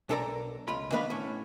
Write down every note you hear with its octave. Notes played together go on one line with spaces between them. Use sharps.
B1 D4 A4 A#4 D5 A#5
C#2 F4 B5
D#3 B3 D4 B4 F5 B5
A2 C#4